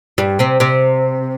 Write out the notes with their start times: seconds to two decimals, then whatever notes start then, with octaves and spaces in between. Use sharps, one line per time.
0.18 G2 G3
0.39 C3 C4
0.60 C3 C4